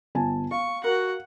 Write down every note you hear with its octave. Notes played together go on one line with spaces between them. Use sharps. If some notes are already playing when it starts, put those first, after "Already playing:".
G1 G#5 A5
F5 C#6
F#4 A#4 F#5